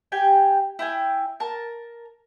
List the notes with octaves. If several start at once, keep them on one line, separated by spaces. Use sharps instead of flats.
G4 G5 G#5
E4 G5 G#5
A#4 A5